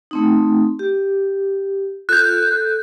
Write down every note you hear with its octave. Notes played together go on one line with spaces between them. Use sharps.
A3 C4 D#4
G4
F4 A4 F#6 G6
A4